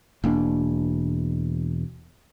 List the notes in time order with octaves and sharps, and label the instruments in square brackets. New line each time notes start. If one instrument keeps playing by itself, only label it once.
[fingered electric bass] E1 A#3 C#4 D4